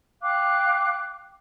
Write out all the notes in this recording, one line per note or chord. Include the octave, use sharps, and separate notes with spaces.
F5 G5 D6 F#6